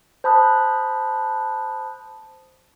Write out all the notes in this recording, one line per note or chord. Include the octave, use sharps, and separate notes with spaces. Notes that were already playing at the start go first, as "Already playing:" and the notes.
C5 A5 B5 D#6 F#6